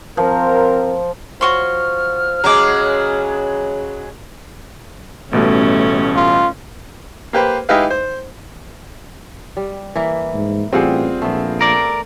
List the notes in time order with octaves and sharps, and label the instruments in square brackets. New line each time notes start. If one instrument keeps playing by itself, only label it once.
[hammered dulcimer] F3 [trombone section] C4 A#4
[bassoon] F3 [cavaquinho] F#4 C#5 C6 [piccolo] F6
[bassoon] C#3 [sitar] F#3 G#3 [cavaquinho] A#5 D6
[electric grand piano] A1 B2 G3 [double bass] A3 [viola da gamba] C#4
[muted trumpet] F4
[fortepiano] A#3 G4 B4 C5
G#3 D#4 E4 G4 B4 F5
C5
[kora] G3
E3 A#3 E4
[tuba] G#2
[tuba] A1 [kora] G3 F#5 [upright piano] C4 F4 G#4
[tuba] A#1 [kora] A3 B3
[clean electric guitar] A#4 D5